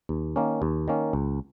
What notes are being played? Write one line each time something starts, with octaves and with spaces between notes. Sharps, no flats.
D#2
D#3 A#3 C#4
D#2
D#3 A#3 C#4
C#2